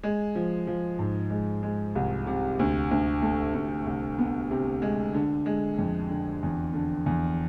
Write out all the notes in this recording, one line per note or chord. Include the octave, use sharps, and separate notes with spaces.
G#3
F3
F3
G#2
G#3
G#3
C2
C3
D2
D2
A3
D2
C2
B3
C3
G#3
D3
G#3
F2
D3
E2
D3
E2